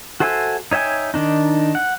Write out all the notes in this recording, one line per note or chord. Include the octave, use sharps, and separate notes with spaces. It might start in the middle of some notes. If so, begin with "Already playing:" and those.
F#4 A4 C5 E5 G#5
D#4 C#5 E5 G5 G#5
D#3 D4 D#4
F#5